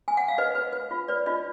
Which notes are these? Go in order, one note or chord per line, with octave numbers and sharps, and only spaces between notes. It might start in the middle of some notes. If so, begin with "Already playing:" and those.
G#5
F#5
F5
B4 D#5
B4
B4
F4
B4 D5
F4 D#5